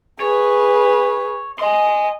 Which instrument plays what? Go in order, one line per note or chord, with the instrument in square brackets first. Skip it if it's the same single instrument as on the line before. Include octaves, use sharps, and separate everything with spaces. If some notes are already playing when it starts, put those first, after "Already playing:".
[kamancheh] G#4 B4 [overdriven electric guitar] C#5
[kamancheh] D#5 [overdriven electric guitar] G#5 C6